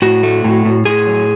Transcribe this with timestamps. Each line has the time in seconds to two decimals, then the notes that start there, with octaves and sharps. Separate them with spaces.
0.02 A2 F#4
0.23 A3
0.44 A2
0.65 A2
0.85 A2 G#4
1.07 F#3